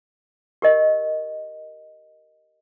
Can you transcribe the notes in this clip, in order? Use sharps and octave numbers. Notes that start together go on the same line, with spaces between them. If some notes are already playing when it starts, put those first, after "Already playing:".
G4 A#4 D#5